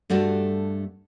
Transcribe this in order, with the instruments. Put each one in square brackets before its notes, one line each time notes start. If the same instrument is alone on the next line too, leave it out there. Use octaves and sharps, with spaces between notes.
[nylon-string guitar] G2 G3 A3 F#4 A4